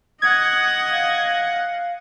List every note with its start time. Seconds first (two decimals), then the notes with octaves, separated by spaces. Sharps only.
0.22 D#5 F#5 D#6 G#6
0.90 F5